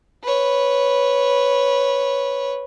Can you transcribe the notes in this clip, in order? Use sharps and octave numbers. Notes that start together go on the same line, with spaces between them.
B4 C#5